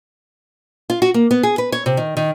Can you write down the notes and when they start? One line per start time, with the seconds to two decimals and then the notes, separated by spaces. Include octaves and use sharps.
0.90 F4
1.02 F#4
1.14 A#3
1.31 B3
1.43 G#4
1.58 B4
1.72 C#5
1.86 C3
1.97 D#3
2.17 D#3